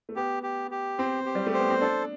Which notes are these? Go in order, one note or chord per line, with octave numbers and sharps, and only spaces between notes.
A3
B3 G4
G4
G4
C4 C5
G4
G3
A3
B3 C5
C4
D4 A4